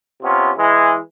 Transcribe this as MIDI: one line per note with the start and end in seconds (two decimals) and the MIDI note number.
0.23 0.51 48
0.23 0.51 59
0.23 0.51 61
0.23 0.51 65
0.57 0.98 52
0.57 0.98 56